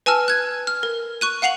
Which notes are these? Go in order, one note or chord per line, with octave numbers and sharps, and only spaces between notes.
B4 G#5 A5 E6 F6
F#6 G#6
F6
A#4
C#6 F#6 D#7
F5 F#5 C7 F7 F#7